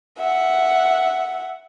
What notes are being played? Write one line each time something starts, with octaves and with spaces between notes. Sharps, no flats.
E5 F#5